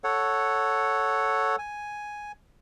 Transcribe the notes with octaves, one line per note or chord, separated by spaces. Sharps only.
A4 C#5 F#5
G#5